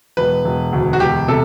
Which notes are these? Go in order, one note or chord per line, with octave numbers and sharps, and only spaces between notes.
E1 B4
E1
D2
F#4
E1 G4
C3 A4